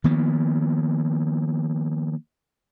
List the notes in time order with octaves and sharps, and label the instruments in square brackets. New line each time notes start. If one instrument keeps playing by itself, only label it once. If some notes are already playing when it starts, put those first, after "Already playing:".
[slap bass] D#3 F3 A#3 B3